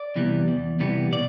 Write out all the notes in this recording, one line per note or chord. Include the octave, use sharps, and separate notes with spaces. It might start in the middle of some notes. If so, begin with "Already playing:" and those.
Already playing: D5
C3 E3 G3 B3
E2
C3 E3 G3 B3
B2 D5